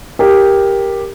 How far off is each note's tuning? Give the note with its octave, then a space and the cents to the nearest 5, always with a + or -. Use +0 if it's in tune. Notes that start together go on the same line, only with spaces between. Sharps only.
G4 +5 A#4 +5